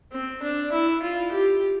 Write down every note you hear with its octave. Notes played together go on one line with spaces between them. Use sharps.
C4
D4
E4
F4
G4